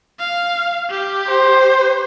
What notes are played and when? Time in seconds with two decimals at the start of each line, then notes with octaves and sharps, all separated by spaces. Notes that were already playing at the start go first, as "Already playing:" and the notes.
0.19 F5
0.90 G4
1.27 C5